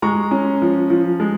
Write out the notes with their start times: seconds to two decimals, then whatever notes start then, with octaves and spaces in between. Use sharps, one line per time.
0.02 G#3 A#5 C#6
0.31 C#4
0.62 F3
0.90 F3
1.20 G#3